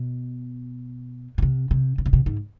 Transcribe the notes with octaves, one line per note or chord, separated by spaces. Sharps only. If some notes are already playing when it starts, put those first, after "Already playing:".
Already playing: B2
B2
C3
C3
C3
B2
C3
G#2